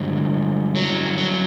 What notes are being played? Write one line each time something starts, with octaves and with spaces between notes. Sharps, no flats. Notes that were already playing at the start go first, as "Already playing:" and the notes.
Already playing: G2 D3 F#3 G#3
F#3
F#3